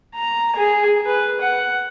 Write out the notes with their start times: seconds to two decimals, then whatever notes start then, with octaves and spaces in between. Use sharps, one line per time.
0.15 A#5
0.56 G#4
1.06 B4
1.41 F#5